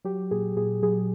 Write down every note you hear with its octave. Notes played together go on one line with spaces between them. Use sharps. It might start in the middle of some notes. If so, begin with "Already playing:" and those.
F#3 G4
A#2 G#4
A#2 G#4
F#3 G#4